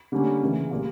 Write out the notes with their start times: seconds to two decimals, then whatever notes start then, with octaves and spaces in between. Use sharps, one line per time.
0.12 D3 G3 A#3 C#4
0.42 C#3 E3 A#3
0.70 A#2 G3 A#3